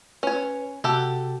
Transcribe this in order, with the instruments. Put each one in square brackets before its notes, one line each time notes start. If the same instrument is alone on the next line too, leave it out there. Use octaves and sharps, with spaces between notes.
[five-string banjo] C#4 C#5 [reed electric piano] B4
[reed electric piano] C3 F#4 [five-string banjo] G4 A4 F#5